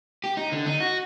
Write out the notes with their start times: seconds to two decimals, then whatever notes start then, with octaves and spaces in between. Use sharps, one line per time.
0.24 G4
0.37 D#4
0.52 D3
0.66 D#4
0.80 F#4